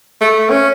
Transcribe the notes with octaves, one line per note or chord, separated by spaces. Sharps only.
A3
C#4